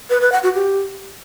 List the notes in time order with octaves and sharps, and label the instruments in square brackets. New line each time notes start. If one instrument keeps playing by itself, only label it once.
[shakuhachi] B4
B4
F#5
F#4
G4